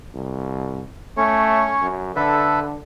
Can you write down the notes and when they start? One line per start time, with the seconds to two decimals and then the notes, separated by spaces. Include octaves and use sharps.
0.14 C2
1.17 A3 C#4 C#5
1.82 F#2
2.16 D3 A4 B4 E5